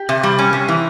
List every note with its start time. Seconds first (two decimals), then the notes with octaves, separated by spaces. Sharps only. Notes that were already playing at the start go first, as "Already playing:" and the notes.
Already playing: G4
0.09 C3
0.23 G3
0.39 C#4
0.53 C3
0.68 E3